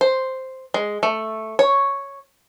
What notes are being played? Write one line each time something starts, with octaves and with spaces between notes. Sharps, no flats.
C5
G#3
A3
C#5